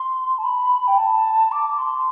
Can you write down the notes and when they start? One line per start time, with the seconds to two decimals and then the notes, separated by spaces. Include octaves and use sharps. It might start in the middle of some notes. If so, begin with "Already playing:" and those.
Already playing: C6
0.38 A5
0.44 B5
0.87 G5
0.98 A5
1.52 D6
1.78 C6